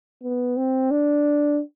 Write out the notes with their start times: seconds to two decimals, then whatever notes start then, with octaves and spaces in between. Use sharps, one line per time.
0.23 B3
0.57 C4
0.91 D4